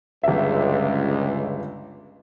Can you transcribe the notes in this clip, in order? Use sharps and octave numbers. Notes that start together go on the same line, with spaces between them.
G1 C#2 E5